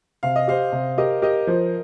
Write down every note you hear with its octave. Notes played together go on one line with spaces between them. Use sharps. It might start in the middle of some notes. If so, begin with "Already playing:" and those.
C3 F5
D#5
G4 C5 F5
C3
G4 A#4 D#5
G4 A#4 D#5
F3